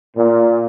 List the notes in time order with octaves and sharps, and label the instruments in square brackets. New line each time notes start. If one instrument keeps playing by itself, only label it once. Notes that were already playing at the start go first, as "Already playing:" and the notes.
[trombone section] A#2